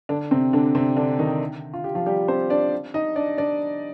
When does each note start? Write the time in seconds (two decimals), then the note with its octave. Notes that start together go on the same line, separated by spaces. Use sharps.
0.09 D3 D4
0.31 C3 C4
0.53 D3 D4
0.75 C3 C4
0.97 D3 D4
1.19 D#3 D#4
1.74 F4
1.84 G4
1.95 F3 F4
2.06 G3 G4
2.28 C4 C5
2.50 D4 D5
2.94 D#4 D#5
3.16 D4 D5
3.38 D4 D5